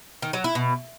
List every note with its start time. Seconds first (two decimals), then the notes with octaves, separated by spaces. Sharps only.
0.22 D#3
0.33 F#3
0.44 E4
0.55 B2